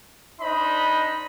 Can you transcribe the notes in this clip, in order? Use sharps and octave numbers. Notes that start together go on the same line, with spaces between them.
D4 D#4 C5 D#5 B5